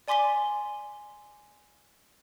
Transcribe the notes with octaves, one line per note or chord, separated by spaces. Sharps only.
D5 G#5 C6 D6 B6 G7